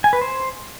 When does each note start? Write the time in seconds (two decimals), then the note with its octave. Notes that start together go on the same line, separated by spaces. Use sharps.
0.04 G#5
0.13 B4
0.22 C5